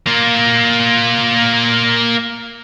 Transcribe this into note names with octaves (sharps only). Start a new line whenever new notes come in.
A#3 F4